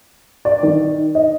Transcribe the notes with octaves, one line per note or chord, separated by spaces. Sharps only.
D5
D#3
D#5